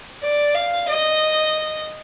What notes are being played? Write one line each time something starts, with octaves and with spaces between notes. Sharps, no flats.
D5
F5
D#5